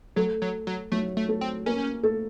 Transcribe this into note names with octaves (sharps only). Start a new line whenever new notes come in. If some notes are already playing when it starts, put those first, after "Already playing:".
F#3 A3 A4
F#3
F#3
F#3 A3 F#4
A3
A3 A4
C4
A#3 C#4 A#4
A3 A4